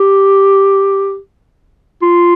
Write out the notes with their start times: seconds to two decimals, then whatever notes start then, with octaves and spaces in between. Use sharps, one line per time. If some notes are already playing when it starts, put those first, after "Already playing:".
Already playing: G4
2.02 F4